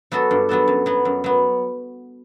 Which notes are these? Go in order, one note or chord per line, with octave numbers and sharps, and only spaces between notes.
F#3 B3 F#4 A4
G2
F#3 B3 F#4 A4
F#2
F#3 B3
F#2
F#3 B3